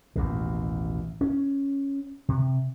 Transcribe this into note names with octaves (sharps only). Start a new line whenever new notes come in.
A1 D#2 B2
C#4
C3